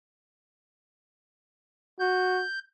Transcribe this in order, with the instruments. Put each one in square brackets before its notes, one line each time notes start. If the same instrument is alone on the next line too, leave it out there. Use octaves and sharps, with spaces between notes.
[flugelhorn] F#4 [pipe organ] G6